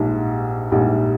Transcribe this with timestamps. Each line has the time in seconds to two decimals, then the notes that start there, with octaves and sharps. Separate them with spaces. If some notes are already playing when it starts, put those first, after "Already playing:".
Already playing: A#1 G#2 G3
0.72 A#1 G#2 G3